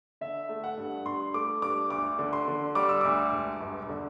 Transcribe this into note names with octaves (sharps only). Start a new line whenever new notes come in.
D3 E5
A3
F#5
G2
G2 C6
A3 D6
G2 D6
D2 D6
D3
C6
D3
G3 D6
E6
D2 D6
E1
G1
D3